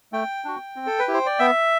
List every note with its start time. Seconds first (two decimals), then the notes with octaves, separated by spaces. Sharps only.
0.12 A3 G5
0.45 D4 F#4
0.76 C4
0.87 A4
0.99 B4
1.08 E4 G4
1.14 C5
1.26 D5
1.39 B3 E5